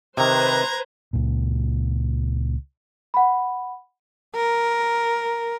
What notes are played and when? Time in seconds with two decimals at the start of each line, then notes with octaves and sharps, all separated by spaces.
0.17 C3 D#3 B4 C5 A#5 G#6
1.13 C#2 A#2
3.14 F#5 B5
4.35 A#4